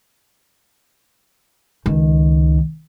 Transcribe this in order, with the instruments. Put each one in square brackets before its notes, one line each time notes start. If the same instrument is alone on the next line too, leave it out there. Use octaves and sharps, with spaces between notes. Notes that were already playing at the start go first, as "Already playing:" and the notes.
[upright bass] C#2 D#3